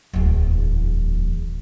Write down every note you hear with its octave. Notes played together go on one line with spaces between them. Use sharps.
D1 E2